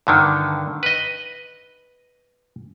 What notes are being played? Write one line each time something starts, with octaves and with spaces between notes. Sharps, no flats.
G2 D3 D#3
B4 D#5